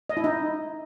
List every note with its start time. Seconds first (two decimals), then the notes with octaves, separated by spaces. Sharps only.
0.09 D#5
0.17 E4
0.24 D#4